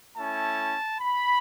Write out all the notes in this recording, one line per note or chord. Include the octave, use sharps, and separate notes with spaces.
A3 C#4 E4 A5
B5